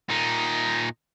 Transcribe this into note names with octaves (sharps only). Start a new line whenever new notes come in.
A#2 D#4